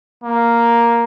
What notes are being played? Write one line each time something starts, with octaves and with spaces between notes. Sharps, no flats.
A#3